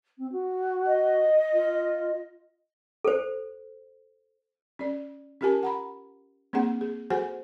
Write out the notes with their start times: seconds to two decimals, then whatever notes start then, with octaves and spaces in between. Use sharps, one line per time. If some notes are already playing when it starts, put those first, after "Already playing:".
0.18 C4
0.32 F#4
0.85 D#5
1.53 F4
3.05 A4 C5
4.79 C#4 D5
5.41 C#4 F4 G4 A#4 G#5 A5
5.63 F#5 A#5 B5
6.53 A#3 C4 D4 G#4 F#5
6.81 G#4
7.10 F#4 G#4 A4 C5 F#5 G#5